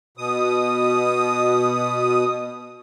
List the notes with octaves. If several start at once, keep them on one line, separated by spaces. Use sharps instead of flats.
B2 D#6